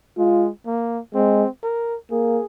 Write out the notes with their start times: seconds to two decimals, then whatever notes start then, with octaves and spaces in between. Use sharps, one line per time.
0.18 G#3 F4
0.66 A#3
1.15 G#3 C4
1.63 A#4
2.11 A#3 G#4